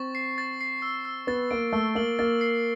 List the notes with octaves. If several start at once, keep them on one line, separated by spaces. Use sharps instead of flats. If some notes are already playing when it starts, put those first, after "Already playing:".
Already playing: C4 C#6 A6
C7
A6
C7
E6
E6
B3 A6
A#3 D7
A3 E6
A#3 F#7
A#3 A6
C7